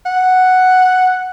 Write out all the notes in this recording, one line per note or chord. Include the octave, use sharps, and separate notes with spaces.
F#5